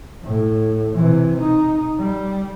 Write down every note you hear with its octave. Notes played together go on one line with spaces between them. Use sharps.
A2
C3 E3
D#4
G3